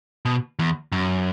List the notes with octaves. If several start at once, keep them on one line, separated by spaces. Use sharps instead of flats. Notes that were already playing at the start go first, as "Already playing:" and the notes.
B2
E2
F#2